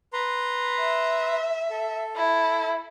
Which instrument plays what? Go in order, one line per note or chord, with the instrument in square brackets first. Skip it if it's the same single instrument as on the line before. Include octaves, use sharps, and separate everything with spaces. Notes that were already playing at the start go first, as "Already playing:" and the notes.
[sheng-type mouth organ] B4 A#5 C6
[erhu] E5
[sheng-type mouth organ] A4
[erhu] E4